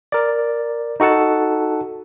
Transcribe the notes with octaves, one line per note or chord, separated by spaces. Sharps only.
A#4 D5
D#4 F#4 A4 F#5 A5